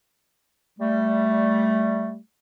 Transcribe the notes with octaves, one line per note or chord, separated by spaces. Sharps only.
G3 A3